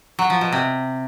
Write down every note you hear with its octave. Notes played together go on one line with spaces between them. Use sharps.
F#3
F3
B2
C3